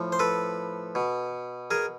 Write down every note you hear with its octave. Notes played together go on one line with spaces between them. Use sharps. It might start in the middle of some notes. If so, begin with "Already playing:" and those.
Already playing: A2 F3
C5
A4 B4
B2
G#4 A#4